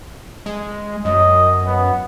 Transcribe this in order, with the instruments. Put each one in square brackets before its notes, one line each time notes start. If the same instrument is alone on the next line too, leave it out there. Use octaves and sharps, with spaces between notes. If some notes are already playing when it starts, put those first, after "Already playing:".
[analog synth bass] G#3
[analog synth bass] F#2 [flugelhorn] D#5
[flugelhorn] B3